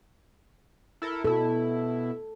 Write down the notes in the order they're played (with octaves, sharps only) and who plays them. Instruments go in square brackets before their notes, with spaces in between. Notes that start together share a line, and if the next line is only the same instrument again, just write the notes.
[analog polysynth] E4 A4 A#4
[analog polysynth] B2 E4 [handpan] A4